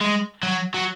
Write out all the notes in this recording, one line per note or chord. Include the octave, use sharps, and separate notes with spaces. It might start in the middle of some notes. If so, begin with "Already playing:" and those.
G#3
F#3
F#3